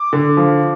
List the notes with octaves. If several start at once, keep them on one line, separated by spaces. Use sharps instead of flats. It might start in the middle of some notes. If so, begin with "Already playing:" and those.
Already playing: D6
D3
F3